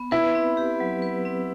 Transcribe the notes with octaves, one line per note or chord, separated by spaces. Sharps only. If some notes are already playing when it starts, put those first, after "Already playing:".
Already playing: B3
E4 B4
C4
G4
F#3
B4
C4